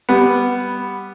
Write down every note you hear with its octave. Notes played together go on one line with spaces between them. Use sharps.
G3 B3